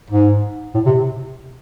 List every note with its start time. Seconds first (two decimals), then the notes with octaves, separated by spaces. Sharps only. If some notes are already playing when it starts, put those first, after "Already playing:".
0.10 G#2
0.75 A2
0.86 C3